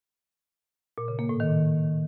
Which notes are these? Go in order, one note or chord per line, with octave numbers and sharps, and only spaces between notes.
A#2
C#3
A#3
A2
D#3